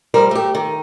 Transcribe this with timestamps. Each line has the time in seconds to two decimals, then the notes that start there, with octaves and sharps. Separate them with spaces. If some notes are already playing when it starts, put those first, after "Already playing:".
0.14 F3 G3 A#4
0.31 A3 G4
0.55 D#3